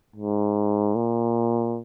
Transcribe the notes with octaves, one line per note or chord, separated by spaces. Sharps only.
G#2
A#2